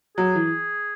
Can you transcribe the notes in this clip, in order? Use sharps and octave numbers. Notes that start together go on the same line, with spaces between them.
F#3 G#4
E3